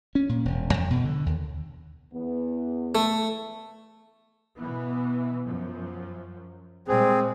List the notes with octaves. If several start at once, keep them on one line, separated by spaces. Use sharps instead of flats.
C#4
A#2
E1
F2
B2
D3
D#2
E2 B3
A3
B2 E3 B3
F#2 F3
A#2 G3 G#3 C4 G#4